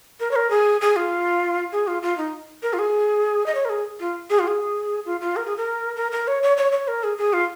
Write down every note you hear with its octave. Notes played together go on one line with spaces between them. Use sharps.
A#4
C#5
A#4
G#4
G#4
F4
G#4
F4
F4
D#4
A#4
F4
G#4
D#5
C#5
A#4
G#4
F4
G#4
F4
G#4
F4
F4
A#4
G#4
A#4
A#4
A#4
C#5
C#5
C#5
C#5
A#4
G#4
G#4
F4